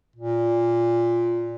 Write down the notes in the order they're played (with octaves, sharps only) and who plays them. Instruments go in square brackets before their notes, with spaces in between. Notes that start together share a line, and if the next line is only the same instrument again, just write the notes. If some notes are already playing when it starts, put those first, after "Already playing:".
[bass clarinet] A#2